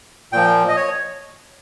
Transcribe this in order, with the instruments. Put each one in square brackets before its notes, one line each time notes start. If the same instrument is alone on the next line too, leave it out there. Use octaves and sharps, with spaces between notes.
[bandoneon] A#2 F3 G5
D#5
C#5